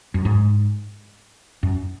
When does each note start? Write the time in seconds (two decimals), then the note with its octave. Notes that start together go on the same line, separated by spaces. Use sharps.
0.14 F#2
0.25 G#2
1.63 F#2